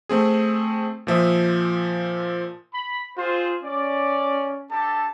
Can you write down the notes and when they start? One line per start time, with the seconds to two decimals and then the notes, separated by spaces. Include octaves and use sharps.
0.09 A3 C4 G#4
1.07 A#2 F3 E5 D#6
2.73 B5
3.17 C4 F4 G#4 C5
3.64 C#4 D5
4.71 D4 G4 A4 A5